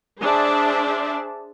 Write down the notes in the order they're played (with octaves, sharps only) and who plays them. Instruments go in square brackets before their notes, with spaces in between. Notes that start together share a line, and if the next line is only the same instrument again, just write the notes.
[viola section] D4 G#4 C5 D5 E5 A5